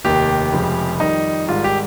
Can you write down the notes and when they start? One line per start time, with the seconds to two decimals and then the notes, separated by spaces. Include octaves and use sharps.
0.04 F1 D#2 D#3 G4
0.52 F1 F2 C#3 F3 G#3
1.00 F2 D#3 G3 D#4
1.48 G#1 G#2 G3 F4
1.64 G4